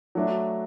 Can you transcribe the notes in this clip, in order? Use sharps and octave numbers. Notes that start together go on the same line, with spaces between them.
F#3 A3 D4